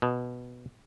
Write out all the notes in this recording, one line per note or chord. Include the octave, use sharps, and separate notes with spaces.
B2